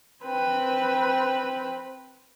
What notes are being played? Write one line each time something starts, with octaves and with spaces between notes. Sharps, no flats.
C4 B4